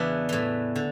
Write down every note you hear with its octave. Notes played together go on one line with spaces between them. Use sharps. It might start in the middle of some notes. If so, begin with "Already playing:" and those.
Already playing: E2 C#3 E3 B3 D4 E4
A2 E3
D3